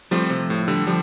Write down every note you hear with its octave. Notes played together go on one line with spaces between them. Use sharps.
F3 G3 A3 C4 F4 C5
C3
A2
D3 G3
D3 F3 G3